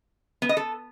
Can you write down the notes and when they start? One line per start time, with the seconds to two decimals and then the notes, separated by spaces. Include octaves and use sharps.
0.42 B3
0.49 D#5
0.57 A4